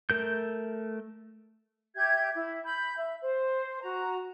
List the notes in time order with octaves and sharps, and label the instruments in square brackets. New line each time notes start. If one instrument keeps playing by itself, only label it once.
[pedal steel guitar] A3 A#4 G6
[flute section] G4 E5 G6 G#6
E4
B5 G6
E5
C5
F#4 A#5